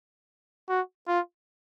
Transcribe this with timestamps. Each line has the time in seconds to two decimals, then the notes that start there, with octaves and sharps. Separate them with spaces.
0.69 F#4
1.08 F4